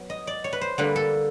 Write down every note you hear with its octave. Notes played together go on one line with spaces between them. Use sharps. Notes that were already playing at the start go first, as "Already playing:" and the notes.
Already playing: F#3 B3
D#5
D5
C#5
B4
C5
D3 G3 A#3 B4
A4